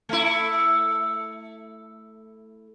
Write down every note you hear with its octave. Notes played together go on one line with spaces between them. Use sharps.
A3 E4